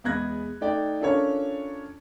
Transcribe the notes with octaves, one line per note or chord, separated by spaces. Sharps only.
E2 G#3 B3 F#6 G#6 A#6
A3 D#4 D5 G5
C#4 D4 F4 A4 A#4 C#5